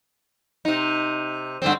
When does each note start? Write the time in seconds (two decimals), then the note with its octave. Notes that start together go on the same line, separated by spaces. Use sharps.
0.65 C3 D#4
1.62 G2 D3 C4